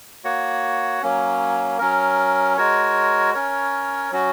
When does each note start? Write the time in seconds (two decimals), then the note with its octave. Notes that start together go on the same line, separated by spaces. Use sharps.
0.24 A#3 F#4 C#5 F#5
1.02 F#3 A#3 C#4
1.79 F#3 C#4 A#4
2.57 G#3 F#4 A#4 C#5
3.34 C#4 A#4 C#5
4.12 F#3 C#4 F#4